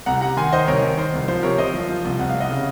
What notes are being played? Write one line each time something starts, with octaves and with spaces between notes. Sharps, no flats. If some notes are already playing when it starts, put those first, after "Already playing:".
C2 F#5 A#5
C3 F#5 A#5
D#3 G#5 C6
D#3 C5 D#5
C2 A#4 C#5
D#3
D#3 C5
C2
F3 C5
C3 A#4 C#5
F3 C5 D#5
F3
F3
C2
C2 F#5
C2 F5
D#5 F#5
C#3